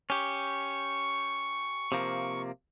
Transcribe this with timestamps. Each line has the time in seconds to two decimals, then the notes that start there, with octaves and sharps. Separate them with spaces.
0.10 C#4 G4 C#6
1.92 C3 F3 A#3